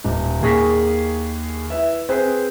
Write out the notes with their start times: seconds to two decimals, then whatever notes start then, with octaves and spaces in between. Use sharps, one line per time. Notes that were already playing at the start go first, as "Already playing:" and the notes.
0.04 D#1
0.41 D#2 A#3 G#4 C#6 A#6 B6
1.70 E4 B4 E5
2.09 C4 G#4 B4 C5